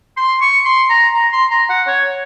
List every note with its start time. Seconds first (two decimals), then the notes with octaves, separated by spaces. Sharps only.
0.17 C6
0.41 C#6
0.65 C6
0.90 A#5
1.14 A#5
1.33 C6
1.50 A#5
1.69 F#5
1.87 C#5